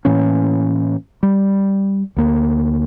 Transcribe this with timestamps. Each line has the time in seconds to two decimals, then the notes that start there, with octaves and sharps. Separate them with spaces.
0.05 A2 E3 A#3 C#4
1.23 G3
2.17 D2 A#3